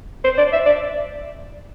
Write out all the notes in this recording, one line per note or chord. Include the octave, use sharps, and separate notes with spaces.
C5
D5
E5
D5